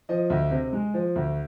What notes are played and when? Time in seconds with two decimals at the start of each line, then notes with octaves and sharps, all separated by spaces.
0.09 F3 D#5
0.30 D2
0.51 C3
0.73 G#3
0.94 F3
1.15 D2